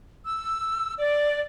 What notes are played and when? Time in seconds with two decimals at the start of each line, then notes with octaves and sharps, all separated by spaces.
0.25 E6
0.99 D5